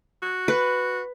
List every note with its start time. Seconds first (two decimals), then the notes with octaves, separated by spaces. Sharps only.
0.23 F#4
0.48 B4